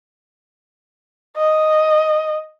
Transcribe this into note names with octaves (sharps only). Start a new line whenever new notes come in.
D#5